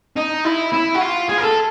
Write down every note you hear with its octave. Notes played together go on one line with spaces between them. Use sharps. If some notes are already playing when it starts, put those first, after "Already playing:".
D#4
E4
E4
F#4
F4
G#4
A#4
A4